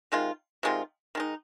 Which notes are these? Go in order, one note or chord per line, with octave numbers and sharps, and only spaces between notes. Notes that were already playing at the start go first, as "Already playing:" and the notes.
C3 D#3 G#3 F4
C3 D#3 G#3 F4
D#3 G#3 D#4